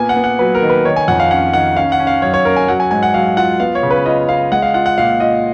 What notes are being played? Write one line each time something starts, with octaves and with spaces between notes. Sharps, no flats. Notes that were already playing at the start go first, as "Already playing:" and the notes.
Already playing: A#2 A#3 B3 G#5
F#5
B3
F#5
F#3 B4
A#4
D#3
B4
D#3 C#5
G#5
F2 F#5
F5
C#4 F#5
D#3 F#5
C#4 F5
F#5
C#4
F5
F#2 C#5
C#5
C#4 A#4
G#5
F#3 F#5
G#5
G#2 G#5
F#5
F#3 F5
F4 F#5
B3 F5
C#5
C#3
B4
F4 D#5
F4 F5
G#3 F#5
F5
F4 F#5
F#5
A#2 F5
F4 D#5